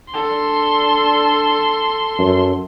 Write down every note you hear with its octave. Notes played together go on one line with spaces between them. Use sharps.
D4 A4 C6
F#2